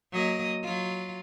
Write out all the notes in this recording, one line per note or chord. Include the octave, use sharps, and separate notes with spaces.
F#3 A#3 D#5
F#3 F4